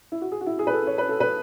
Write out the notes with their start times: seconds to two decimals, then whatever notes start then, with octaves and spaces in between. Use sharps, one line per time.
0.12 E4
0.22 F#4
0.32 G#4
0.41 F#4
0.46 E4
0.59 G#4
0.67 B4
0.73 A4
0.87 C#5
0.98 B4
1.09 A4
1.20 B4